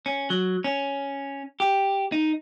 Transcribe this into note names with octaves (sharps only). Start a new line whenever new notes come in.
C#4
F#3
C#4
G4
D#4